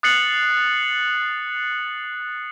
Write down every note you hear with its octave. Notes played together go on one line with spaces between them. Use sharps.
D#6 F#6 A6 C7 C#7 F#7